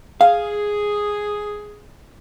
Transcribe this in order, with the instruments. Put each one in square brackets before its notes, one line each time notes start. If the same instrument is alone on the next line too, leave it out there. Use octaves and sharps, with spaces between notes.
[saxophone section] G#4 [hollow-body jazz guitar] F5